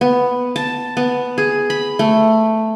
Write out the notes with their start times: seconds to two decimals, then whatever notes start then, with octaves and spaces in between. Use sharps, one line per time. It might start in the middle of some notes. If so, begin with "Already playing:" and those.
0.01 B3
0.56 A5
0.97 B3
1.38 G#4
1.70 B5
1.99 A3